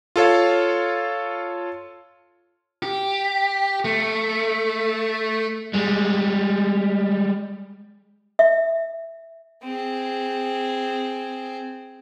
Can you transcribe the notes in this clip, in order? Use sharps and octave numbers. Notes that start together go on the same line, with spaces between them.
F4 A4 C#5 F5
G4
A3
G3 G#3
E5
C4 G#4